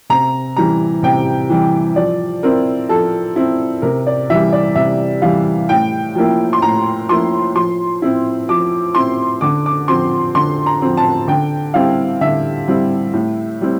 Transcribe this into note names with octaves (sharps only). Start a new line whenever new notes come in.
C3 A#5
E3 G3 A#5
C3 G5
E3 G3
F3 D5
C4 E4 A#4
F3 A4
C4 E4
C3 A#4
D5
E3 G3 E5
D5
C3 E5
E3 G3 F5
A2 G5
F3 A#3 E4
C6
A2 A#5
F3 A#3 E4 C6
F3 C6
C4 E4
F3 D6
C4 E4 C6
D3 D6
D6
F3 C4 C6
D3 C6
A#5
F3 C4
A5
D3 G5
G3 C4 E4 F5
D3 E5
G3 C4 E4
A2
G3 C4 E4